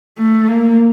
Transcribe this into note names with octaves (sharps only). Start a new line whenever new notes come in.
A3
A#3